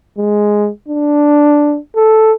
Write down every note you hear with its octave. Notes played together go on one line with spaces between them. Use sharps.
G#3
D4
A4